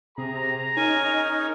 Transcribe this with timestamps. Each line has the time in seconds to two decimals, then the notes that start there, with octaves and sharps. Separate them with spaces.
0.18 C3 G#4 A#5
0.77 C#4 D#4 A#4 C#5 G#5